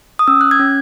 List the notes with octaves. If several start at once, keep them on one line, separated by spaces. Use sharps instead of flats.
D#6
C#4 E6
F#6
G#6
C#4